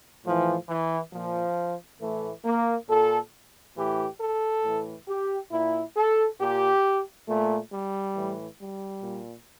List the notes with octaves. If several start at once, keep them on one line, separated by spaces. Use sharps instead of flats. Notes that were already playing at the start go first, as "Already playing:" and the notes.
A2 E3 F3
E3
A#2 F3
A2 E3 A3
A#3
A#2 A4
A2 E3 G4
A4
A2 E3
G4
A#2 E4
A4
A#2 G4
A#2 A3
G3
A2 E3
G3
A#2